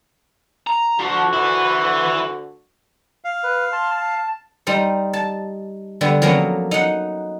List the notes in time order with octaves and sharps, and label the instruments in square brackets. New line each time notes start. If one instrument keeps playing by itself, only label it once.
[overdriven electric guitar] A#5
[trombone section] D2 D3 F#4 [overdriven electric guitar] F3
[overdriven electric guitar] E4 B4
[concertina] F5
[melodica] B4
A5 C6
A5
[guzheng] G3 D#4 C5
A5
D3 G3 B3
F3 F#3 A#3 B3 C#4
D#4 F#5